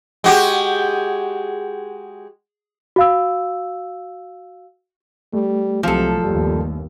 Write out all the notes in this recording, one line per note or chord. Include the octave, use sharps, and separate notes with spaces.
G#3 F#4 G4
F#4 F5 E6
G3 A3
C2 C3 F3 F#3 G#3 A4
G1 D#2 G3